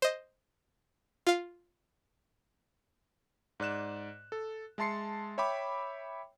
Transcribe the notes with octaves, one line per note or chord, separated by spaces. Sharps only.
C5 D#5
F4 F5
G#2 D5 F#6 E7
A4
G#3 E5 A5 C6 C7 C#7
C#5 E5 G5 B5 D6